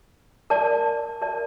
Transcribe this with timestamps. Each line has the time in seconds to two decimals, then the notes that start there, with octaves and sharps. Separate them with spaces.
0.50 A#4 D5 A5
1.22 A#4 D5 A5